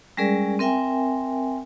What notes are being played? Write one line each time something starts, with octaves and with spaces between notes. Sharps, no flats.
G3 G#3 C#4 G#4 A#4 D5
C4 A#4 E5 G5 G#5